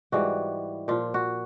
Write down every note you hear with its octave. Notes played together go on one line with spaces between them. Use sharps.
G#2 E3 G3 F#4
A#2 F3 F4
F#4